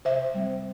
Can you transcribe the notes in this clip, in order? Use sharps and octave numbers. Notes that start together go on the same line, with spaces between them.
C3 C5 E5
G3 C4